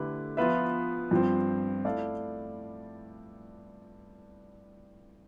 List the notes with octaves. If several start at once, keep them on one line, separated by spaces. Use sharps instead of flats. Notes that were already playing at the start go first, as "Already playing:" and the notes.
Already playing: D3 A3 E4 G4 B4
F3 B3 F4 B4 E5
G2 F3 C4
A3 E4 A4 D5 F5